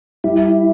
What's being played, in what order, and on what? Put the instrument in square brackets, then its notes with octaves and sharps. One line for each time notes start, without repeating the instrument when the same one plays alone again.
[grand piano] G3 [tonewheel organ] E4